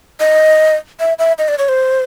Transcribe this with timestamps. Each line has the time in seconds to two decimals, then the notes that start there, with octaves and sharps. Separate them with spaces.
0.20 D#5
1.00 E5
1.19 E5
1.39 D#5
1.48 D5
1.58 C#5
1.69 C5